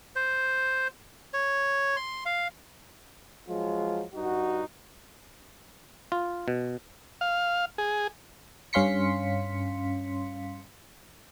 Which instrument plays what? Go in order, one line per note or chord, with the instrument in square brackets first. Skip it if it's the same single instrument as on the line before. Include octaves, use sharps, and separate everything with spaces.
[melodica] C5
C#5
C6
F5
[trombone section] F3 F#3 G#3 F4
G2 D#4 F#4
[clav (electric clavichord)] F4
B2
[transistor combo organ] F5
G#4
[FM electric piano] G2 C#4 F5 C6 B6 C#7